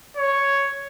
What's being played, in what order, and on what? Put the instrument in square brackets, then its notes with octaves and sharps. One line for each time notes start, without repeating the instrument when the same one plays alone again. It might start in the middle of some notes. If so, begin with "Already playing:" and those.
[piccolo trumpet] C#5